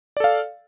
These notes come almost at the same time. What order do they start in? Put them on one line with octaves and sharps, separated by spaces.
D5 A4 F5